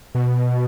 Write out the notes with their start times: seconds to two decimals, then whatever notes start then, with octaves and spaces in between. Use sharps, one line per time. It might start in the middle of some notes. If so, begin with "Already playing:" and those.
0.15 B2